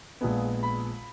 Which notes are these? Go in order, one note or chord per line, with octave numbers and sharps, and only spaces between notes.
A#1 A#2 G#3 B3
B5